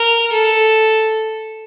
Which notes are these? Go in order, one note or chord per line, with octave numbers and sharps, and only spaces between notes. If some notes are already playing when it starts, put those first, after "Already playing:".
Already playing: A#4
A4